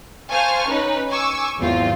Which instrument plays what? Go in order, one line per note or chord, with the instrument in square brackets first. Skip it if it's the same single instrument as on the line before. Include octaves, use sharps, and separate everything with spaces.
[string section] C5 F5 G#5 A5 C#6 F6
C#4 D#4 B4
G#5 C#6 D6 E6
G#1 E2 F#3 C4 F4